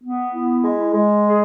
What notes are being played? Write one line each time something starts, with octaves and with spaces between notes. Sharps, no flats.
B3
E4
G#3
G#3
G#4